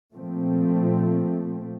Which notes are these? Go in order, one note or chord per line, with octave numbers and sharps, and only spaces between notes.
A#2 F3 A3 C4